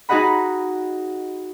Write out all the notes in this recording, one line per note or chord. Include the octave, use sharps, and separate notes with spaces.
D#4 F#4 G#4 D#5 F#5 B5